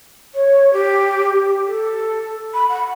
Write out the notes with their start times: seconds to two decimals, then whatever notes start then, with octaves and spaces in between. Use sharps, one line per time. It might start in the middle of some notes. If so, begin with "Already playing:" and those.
0.34 C#5
0.73 G4
1.67 A4
2.54 B5
2.69 F#5